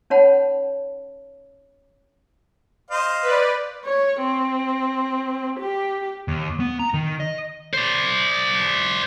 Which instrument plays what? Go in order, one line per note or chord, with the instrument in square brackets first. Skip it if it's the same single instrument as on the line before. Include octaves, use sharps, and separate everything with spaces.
[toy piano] C#4 D#4 C#5 F#5 A5 B5
[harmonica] C5 D#5 F5
[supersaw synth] B4 D5
[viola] C#5
C4
G4
[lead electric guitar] D#2
B3
A#5
D#3
D#5
[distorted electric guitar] C5 D5